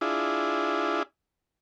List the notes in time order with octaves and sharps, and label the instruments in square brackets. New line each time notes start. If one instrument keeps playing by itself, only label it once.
[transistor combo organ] D4 E4 F4 G#4